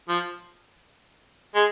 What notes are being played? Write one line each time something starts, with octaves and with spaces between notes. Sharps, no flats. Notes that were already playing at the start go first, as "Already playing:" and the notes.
F3
G#3